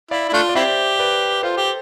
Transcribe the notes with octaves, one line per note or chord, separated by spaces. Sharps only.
E4 D5 F5
E4
A3 D4 F4
D5
C4 E4 G4 C5 E5
B4 D5
F4 A4 C5
G4
A4